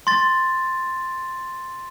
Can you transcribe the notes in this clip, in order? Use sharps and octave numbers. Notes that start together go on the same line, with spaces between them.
C6 A6